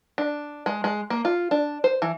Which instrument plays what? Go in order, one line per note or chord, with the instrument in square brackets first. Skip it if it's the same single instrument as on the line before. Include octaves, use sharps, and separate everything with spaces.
[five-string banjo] D4
G#3
G#3
A#3
F4
D4
C5
E3